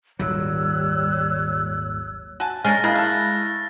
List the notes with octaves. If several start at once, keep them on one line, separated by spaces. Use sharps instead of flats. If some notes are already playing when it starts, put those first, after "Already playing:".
D#1 G#1 F#3 G3 C#5 E6 F#6
F#4 G#5 A5
G#3 C#4 D4 A#4 F6 A6 A#6
A#3 E4 D#5 F5 F#6
A3 A4